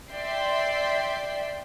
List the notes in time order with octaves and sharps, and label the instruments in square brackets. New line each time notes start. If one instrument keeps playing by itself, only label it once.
[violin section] D5 E5 G5 C6